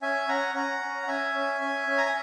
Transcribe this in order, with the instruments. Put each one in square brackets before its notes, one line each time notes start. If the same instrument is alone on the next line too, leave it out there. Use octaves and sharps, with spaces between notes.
[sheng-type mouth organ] C#4 E5 G#5
C#4 F#5 A#5
C#4 F#5 A#5
C#4
F#5
C#4 E5 G#5
C#4
C#4
C#4
A#5
G#5